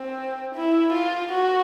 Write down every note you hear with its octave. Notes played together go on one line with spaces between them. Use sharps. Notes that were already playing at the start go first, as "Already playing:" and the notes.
Already playing: C4
E4
F4
F#4